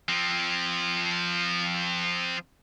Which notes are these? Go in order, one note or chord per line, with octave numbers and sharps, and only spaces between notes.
F3 C4